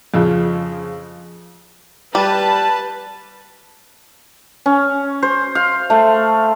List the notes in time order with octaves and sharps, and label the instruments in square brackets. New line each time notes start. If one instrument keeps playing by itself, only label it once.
[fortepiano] F2 C#3 F3
[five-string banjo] G3 [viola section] B4 A5
[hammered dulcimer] C#4
C5
F5
A3